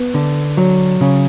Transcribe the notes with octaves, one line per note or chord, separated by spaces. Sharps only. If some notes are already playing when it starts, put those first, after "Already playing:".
Already playing: B3
D3
F#3
C#3